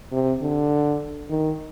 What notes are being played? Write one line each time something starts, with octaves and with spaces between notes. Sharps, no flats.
C3
D3
D#3